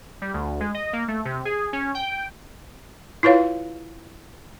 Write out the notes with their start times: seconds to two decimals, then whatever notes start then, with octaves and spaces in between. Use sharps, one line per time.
0.22 G3
0.34 D2
0.61 G#3
0.74 D#5
0.93 A#3
1.08 A3
1.25 C3
1.45 G#4
1.73 C#4
1.95 G5
3.23 E4 F4 B4 C#5 F5